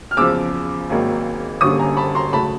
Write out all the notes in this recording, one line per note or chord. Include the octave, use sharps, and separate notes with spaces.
F6
E2 C#3 F3 D6 E6
G#1 G#2 D#3 F#3 A#3
G1 F#2 D3 G3 A#3 C#6 D#6
G#5 A#5
A5 B5
A#5 C6
C#2 C#3 F#3 A3 A5 B5